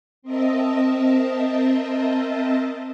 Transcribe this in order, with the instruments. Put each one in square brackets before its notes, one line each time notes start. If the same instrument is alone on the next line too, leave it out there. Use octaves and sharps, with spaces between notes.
[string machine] C4 A#4 D#5 E5 A5